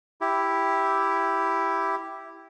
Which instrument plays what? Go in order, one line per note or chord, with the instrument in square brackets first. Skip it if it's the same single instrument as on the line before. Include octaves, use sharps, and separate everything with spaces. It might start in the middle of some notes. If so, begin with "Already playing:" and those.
[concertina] E4 G4